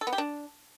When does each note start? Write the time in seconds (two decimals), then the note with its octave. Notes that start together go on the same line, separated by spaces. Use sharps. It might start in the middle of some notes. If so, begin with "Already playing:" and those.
0.01 A4
0.07 B3
0.13 G4
0.18 D4